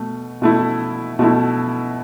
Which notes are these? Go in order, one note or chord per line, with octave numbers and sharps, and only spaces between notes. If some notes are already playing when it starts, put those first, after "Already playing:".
Already playing: B2 A3
B2 A3 E4
B2 A3 E4